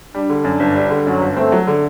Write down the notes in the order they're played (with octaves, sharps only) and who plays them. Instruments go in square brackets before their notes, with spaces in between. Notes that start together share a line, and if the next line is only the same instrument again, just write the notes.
[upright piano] G3 [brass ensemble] D4
[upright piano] D3
F#2
G1
G3
D3
[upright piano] F#2 [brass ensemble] F#3
[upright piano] G1
[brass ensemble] A3 [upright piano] C4
[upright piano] F#3
D3